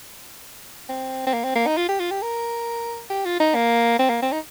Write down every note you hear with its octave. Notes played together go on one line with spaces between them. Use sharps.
C4
C4
A#3
C4
A#3
D#4
F4
G4
F4
G4
A#4
G4
F4
D#4
A#3
C4
A#3
C4
D#4